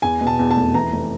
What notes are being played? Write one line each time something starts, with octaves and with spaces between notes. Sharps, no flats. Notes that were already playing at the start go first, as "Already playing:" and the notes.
E2 G#5
B2
A5
E2
A5
F1
E3 A#5
F1